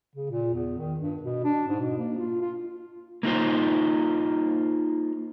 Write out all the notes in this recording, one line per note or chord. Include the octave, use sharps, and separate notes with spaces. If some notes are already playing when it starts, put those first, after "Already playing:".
C#3
A#2
E2
D#3
G2
B2
D4
G#2
B2
A#3
F4
F4
A#3 D#4 F4 C5